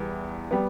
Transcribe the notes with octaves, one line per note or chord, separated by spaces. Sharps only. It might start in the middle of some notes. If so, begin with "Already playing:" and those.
Already playing: E2 E3 G3 B3
G3 B3